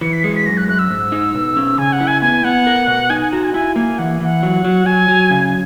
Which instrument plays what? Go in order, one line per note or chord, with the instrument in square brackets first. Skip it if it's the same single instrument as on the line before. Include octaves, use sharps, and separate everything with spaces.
[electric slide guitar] E3 [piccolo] C#7
[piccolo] B6
[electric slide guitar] G#3 [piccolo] C#7
[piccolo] B6
[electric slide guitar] F#2 [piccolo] A#6
[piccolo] F#6
[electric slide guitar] F#2 [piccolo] F#6
[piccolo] E6
[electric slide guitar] G#2
D#4
B2
C#4
[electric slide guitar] C#3 [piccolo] G#5
[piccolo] F#5
[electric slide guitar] E4
[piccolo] G#5
[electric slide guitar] B3 [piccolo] G#5
[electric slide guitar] B3 [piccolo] F#5
[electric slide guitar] A#4
B2
[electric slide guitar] D#4 [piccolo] G#5
[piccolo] G#5
[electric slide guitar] F#4 [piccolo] A#5
[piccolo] G#5
[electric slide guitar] E4 [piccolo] G#5
[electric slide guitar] A#3 [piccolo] G#5
[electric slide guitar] E3 [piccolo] F#5
[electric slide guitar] E3 [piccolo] F#5
[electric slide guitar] F#3
F#3
[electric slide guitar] F#3 [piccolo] G#5
[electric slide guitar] F#3
C#3